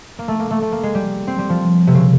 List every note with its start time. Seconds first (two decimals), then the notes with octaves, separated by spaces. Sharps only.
0.19 A#3
0.28 A3
0.39 A#3
0.51 A3
0.62 A3
0.72 A#3
0.83 G#3
0.95 G3
1.27 C4
1.39 G3
1.49 F3
1.87 C3
1.94 C#3